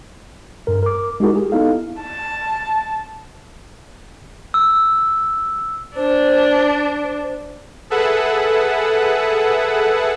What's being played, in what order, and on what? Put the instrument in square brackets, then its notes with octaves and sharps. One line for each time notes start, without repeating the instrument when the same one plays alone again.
[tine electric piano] G2 A#4
A#4 D6
G#3 D#4 E4 F#4 G#4 A#4
G4 G#4
B3 D#4 E4 A4 F5
[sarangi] A5
[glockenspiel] E6
[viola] D4 [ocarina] C5
[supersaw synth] G#4 A4 B4 E5 F#5